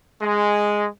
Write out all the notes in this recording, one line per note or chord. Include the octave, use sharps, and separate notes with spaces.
G#3